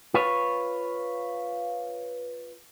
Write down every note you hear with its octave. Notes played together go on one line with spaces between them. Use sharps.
F4 B4 C#5